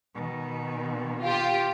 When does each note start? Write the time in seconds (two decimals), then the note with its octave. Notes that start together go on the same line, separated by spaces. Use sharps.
0.14 B2 D#3
1.21 F4 G4